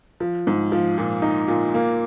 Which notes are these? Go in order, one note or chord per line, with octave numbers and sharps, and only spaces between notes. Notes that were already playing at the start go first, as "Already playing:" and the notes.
F3
G#2
F3
A#2
D#4
A#2
A#3